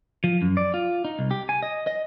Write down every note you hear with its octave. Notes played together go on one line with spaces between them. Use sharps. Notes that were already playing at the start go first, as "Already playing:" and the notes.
F3
F#2
D5
F4
D#4
C2
G4
G#5
D#5
D#5